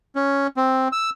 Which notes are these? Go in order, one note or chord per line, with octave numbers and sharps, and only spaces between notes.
C#4
C4
E6